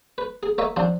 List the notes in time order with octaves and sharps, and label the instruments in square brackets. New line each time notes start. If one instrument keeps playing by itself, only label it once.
[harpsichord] B4
G#4
A#3 C#5 D#5 E5
F3 C4 D4